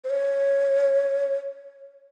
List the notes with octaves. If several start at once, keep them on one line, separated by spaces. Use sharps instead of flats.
C5
C#5